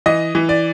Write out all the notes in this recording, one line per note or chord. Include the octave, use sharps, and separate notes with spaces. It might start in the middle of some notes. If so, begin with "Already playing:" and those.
E3 D#5
E3
D5